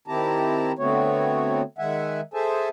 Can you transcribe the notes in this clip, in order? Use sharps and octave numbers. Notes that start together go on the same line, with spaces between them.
D#3 C4 E4 G4 A5 A#5
D3 A3 B3 C4 F#4 C#5
D#3 G#3 E5 F#5 G#5
G#4 A4 C5 E5 G#5 A5